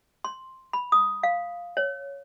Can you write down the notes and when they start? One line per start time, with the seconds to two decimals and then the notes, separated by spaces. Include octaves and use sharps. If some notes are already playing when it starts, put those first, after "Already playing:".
0.24 C6
0.73 B5
0.92 D#6
1.23 F5
1.77 C#5